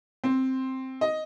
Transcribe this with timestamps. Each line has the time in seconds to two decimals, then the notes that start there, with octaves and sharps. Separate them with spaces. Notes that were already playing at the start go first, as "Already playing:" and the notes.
0.24 C4
1.01 D#5